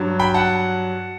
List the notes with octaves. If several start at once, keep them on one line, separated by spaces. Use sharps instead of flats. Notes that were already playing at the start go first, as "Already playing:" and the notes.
Already playing: G2 F#3
G5 B5
F#5 A5